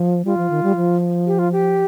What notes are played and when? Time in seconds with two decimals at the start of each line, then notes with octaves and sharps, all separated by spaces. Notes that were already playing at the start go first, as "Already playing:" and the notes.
Already playing: F3
0.25 G3 F4
0.37 F3
0.50 D#3
0.63 G3
0.76 F3
1.27 G4
1.39 F4
1.52 G4